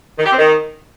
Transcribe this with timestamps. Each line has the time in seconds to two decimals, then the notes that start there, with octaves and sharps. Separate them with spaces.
0.18 D#3
0.25 G4
0.32 C4
0.38 D#3